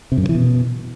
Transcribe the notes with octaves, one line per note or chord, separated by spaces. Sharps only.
C3
F#2
C#3
E3
B2